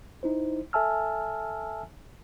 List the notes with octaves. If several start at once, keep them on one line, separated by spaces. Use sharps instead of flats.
D#4 E4 C5
A4 E5 G#5 A5 E6 F6